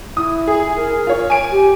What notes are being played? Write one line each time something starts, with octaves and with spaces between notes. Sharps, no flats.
E4 D#6
G#4
A#4
F4 C#5
G#5 D7
G4